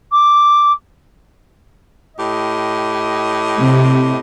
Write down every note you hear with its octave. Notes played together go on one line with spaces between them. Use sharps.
D6
A2 G4 D#5
C3